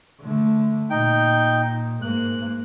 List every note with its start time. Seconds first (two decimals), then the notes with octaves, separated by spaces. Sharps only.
0.21 D3 A3
0.90 A#2 D#4 G5
2.02 G#2 A#3 F#6